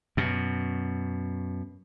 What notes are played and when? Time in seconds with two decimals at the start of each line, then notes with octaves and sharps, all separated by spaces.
0.17 F#2 B2